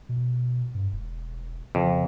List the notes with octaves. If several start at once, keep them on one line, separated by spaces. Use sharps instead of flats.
B2
G2
E1
F2 C#3